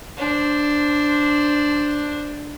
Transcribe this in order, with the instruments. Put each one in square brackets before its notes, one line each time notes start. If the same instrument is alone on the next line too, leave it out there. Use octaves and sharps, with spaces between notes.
[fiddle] D4 C5